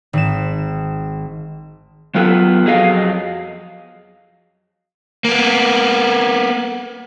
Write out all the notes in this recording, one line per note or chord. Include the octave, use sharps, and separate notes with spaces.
G#1 E7
F#3 B3 F4 A4 B4
F2 F#3 G#4 D#5 F5
A#3 B3